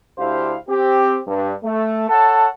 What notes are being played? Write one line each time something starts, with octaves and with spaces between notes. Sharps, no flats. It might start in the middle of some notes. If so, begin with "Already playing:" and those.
D2 D4 E4 G4 C5 F5
C4 G4
G2
A3
A4 C#5 F#5 A5